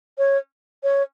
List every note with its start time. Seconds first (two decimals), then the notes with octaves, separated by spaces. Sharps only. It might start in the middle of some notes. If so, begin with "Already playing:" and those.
0.18 C#5
0.83 C#5